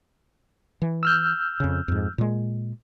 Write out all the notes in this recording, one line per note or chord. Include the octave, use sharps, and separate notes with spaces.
E3
E6 F6 G6
F2 C#3
F2 G#2
A#2 G#3